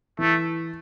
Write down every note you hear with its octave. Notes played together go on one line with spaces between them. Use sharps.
E3 A3